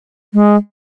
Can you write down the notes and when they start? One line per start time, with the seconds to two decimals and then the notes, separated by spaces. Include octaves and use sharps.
0.34 G#3